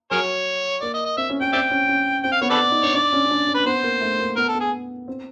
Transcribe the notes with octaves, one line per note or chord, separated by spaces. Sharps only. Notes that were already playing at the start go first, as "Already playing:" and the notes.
F#3 G#4 A#4 C#5
A#3 D5
D#5
D#5
C4 E5
C#4
C#4 G5
C4 D5 E5 G5
C#4
C#4
C4 G5
F5
B3 C#5
A4 B4 D5
D#4
D4 C#5
D4 D5
C#4
C#4
D4
C#4
B4
B3 C5
A#3
A3
A#3
B3 A#4
A4
B3
G#4
C4